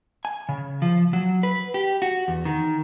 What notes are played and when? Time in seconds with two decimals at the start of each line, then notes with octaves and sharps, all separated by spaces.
0.25 G#5
0.49 C#3
0.82 F3
1.13 F#3
1.43 B4
1.74 G4
2.02 F#4
2.28 E2
2.45 D#3